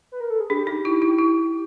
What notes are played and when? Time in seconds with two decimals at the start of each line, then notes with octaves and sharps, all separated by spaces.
0.12 B4
0.20 A#4
0.30 A4
0.40 G#4
0.50 D4 G4
0.67 D#4
0.85 E4
1.02 E4
1.18 E4